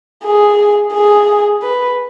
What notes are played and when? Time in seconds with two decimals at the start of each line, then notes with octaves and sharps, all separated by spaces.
0.24 G#4
0.93 G#4
1.62 B4